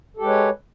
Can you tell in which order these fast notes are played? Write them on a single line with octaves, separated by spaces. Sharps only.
A4 G4 G#3 B4 C#5